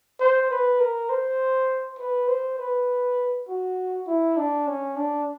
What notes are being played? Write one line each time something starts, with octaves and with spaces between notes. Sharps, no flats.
C5
B4
A#4
C5
B4
C5
B4
F#4
E4
D4
C#4
D4